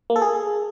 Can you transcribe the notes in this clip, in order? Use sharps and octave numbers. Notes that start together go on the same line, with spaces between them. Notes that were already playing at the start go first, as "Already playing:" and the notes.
A#3
A4
G#4